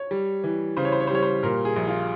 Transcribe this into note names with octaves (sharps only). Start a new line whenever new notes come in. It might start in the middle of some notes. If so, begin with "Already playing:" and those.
Already playing: C#5
G3
E3
C#3 C5
C#5
C5
C#5
C5
G3 C#5
C5
A#2 A#4
G#4
A#1
F4